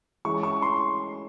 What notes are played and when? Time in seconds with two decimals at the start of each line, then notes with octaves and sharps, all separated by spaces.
0.25 E3 G#3 C#4 C#6
0.43 C#6
0.62 C6